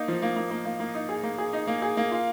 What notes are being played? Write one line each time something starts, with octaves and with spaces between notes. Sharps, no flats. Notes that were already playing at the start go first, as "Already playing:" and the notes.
Already playing: A#3 D#4
F3
A#3
A#3
A#3
A#3
A#3
D#4
G#4
A#3
G#4
D#4
A#3
G#4
A#3
F4